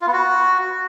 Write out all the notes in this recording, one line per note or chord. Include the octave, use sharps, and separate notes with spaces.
F4
B3
F#4